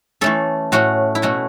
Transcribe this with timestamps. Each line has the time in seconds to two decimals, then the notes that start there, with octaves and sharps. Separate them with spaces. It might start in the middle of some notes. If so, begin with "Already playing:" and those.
0.21 E3 A3 C#4 A4
0.72 A2 A3 C#4 F#4
1.15 E4
1.22 B2 A3 C#4 F#4